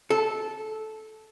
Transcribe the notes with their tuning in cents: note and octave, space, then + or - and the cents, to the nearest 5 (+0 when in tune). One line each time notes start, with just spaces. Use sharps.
A4 -15